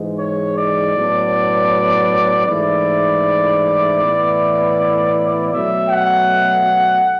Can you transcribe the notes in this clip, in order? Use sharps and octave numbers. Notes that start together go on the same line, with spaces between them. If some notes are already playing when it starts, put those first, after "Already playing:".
Already playing: G#2 E3 G#3
C#5
D5
A2 F#3 B3 D4
G#2 E3 A3 E4 D5
A2 E3 B3 E4
B2 F#3 A3 E5
F#5